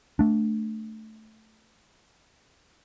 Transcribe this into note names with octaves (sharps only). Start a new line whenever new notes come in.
A3 D4